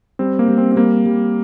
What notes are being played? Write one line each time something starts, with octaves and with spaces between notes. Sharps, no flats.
G3 C4
A#3
G3
C4
C4
G3 A#3
G3